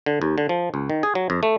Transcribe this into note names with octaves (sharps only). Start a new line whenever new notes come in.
D3
D#2
D3
F3
C#2
D#3
G#4
F#3
F2
A3